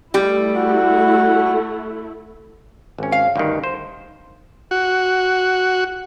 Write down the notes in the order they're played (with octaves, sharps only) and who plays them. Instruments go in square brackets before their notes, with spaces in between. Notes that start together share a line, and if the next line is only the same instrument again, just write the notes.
[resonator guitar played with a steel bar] G3 G4 [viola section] A3 E4
[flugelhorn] F#4
[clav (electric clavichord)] G#1 C#4
[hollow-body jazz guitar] F5
[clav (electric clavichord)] D2 G2 D#3
C5
[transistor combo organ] F#4